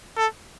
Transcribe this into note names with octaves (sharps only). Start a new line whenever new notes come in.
A4